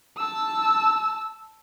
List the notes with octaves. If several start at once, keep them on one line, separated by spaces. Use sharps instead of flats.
A5 E6